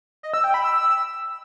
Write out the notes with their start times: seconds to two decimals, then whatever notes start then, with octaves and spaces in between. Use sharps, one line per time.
0.23 D#5
0.34 E6
0.44 G5
0.54 B5
0.64 E6